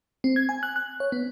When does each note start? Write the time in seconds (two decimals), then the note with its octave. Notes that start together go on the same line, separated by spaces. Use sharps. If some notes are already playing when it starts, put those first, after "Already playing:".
0.24 C4
0.36 G#6
0.49 G#5
0.63 F#6
0.76 F#6
1.00 C#5
1.12 B3